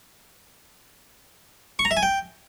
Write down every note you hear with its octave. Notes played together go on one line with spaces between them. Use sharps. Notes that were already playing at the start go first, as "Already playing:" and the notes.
C#6
A#5
E5
G#5
G5